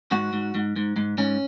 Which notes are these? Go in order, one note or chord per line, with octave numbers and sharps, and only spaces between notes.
G#2 F#4
G#2
G#2
G#2
G#2
G#2 C#4